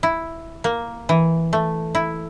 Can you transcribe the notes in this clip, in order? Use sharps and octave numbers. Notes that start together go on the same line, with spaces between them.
E4
A#3
E3
A3
E4